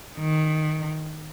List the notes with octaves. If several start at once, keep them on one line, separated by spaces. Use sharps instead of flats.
D#3